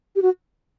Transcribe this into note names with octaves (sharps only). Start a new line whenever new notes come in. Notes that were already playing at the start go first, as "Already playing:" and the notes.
G4
F#4